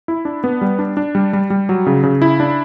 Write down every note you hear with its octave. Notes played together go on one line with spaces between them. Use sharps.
E4
D4
B3
G3
D4
D4
G3
G3
G3
F#3
C#3
C#3
E4
D4